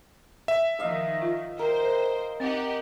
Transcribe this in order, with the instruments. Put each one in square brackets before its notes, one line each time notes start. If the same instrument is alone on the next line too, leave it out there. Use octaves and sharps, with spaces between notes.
[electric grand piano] E5
[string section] D#3 F3 [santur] D#5 F5 D#6
[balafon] F4
[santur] A#4 [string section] C5 G5
[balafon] C4 [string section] D#4 G4 F#5